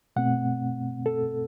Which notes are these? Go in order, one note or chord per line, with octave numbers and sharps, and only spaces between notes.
B2 A3 C4 F#5
A4